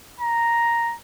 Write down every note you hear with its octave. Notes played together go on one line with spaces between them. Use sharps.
A#5